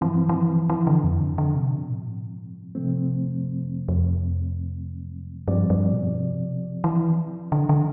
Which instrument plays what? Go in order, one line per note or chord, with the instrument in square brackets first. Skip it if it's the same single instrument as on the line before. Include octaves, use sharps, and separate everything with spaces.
[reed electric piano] G2 F3 C4 [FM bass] E3
[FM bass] E3
E3
D3
F2
D3
D3
C3
B2
A2
B2
A2
[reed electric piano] C3 F3 A3 C4
[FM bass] E2
F2
G2
F2
F2
[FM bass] G2 [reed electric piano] F3 C4 G4 D5
[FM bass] G2
B2
C3
E3
D3
D3